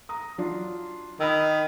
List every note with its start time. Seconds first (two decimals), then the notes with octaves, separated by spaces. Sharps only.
0.09 A#5 D#6
0.38 F#3 D4 F4
1.20 D#3 B5 D#6 E6